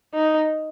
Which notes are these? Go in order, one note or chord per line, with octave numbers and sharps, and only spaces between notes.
D#4